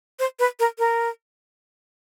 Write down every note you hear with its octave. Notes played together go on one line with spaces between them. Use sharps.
C5
B4
A#4
A#4